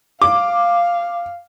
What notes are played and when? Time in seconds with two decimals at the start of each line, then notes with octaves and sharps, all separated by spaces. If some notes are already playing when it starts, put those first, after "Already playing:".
0.22 F5 D6